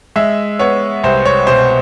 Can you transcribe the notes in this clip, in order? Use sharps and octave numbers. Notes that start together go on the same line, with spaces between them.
G#3 E5
B3 C#5
C2 C5
C#5
B2 C5